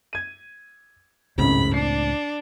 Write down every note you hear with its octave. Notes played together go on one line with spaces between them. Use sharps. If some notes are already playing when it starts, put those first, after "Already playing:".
G#6 D#7
G#1 C#2 F#2 A2 C#3 C4 B5
D4 C7